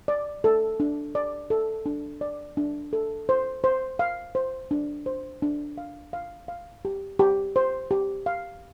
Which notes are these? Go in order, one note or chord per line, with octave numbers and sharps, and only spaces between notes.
D5
A4
D4
D5
A4
D4
D5
D4
A4
C5
C5
F5
C5
D4
C5
D4
F5
F5
F5
G4
G4
C5
G4
F5